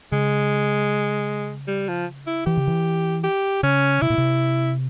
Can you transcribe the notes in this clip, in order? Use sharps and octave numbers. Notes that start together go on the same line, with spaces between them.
C#3 G#3
G3
F3
E4
E3 G4
C#3
E3
G4
C#3 C#4
C3 E4
A#2
C3